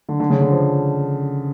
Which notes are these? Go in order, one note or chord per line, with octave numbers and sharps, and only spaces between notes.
D3
D3
C#3
D3
F3